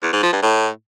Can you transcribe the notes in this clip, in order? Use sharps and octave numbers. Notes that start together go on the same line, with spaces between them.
E2
G#2
F3
G2
A2